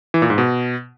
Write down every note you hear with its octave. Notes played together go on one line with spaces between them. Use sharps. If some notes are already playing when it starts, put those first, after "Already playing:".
E3
A#2
G#2
B2